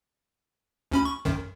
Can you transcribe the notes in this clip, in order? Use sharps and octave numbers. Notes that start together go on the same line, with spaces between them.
D2 C#4 B5
C#6
B1 F#2 D#3